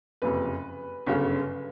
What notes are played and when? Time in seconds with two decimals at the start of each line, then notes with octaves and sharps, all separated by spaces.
0.22 F#1 F2 C3 B4
1.07 G1 F#2 C#3